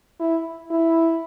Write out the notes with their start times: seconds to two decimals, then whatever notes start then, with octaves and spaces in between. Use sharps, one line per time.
0.20 E4
0.71 E4